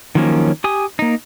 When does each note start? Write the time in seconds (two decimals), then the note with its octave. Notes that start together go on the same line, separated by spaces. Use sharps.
0.15 D#3 F3 F#3 A#3 C#4
0.64 G4 G#5 D#6
0.99 A#3 D#4